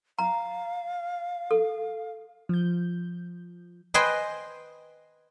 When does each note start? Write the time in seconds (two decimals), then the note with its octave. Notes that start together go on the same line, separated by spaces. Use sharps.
0.19 F5 A#5
1.51 A4
2.49 F3 G6
3.94 B4 C5 D#5 G5 G#5 C6